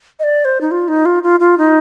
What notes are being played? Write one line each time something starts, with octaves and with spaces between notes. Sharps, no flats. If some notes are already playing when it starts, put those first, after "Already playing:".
D#5
D5
C5
D#4
F4
D#4
F4
F4
F4
D#4